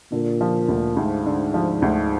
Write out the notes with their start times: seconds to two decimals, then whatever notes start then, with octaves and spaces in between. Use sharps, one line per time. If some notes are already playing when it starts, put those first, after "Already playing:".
0.12 A#2 D3
0.41 F3
0.68 D2
0.97 D2 G#2
1.26 D3
1.54 F3
1.82 D2